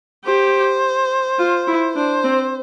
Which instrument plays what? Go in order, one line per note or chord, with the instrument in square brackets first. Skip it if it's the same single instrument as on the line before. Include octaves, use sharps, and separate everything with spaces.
[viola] G4 [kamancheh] C5
[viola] F4
E4
[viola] D4 [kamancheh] C5
[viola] C4